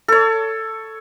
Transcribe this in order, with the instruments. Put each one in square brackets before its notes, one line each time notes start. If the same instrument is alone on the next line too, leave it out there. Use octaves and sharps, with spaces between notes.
[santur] A4 C#5